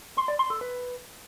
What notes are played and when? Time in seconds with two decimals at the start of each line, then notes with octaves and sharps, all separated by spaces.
0.17 C6
0.28 D5
0.39 C6
0.50 A4
0.61 B4